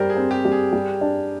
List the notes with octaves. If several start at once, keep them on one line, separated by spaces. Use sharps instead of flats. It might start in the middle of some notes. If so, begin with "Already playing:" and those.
Already playing: G3 A#4 C5
G#4
C4
G4
G3
G#4
G3
D4